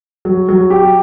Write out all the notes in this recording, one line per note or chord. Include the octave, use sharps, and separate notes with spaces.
F#3
F#3
G4